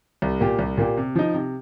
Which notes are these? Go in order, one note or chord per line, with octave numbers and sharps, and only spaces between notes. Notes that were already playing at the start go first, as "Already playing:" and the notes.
C2
A#2 A#3 G4
C2
A#2 A#3 G4
C3
F3 D#4
C3